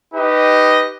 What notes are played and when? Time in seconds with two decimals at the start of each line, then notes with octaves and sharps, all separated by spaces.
0.15 D#4 G4 B4 D#5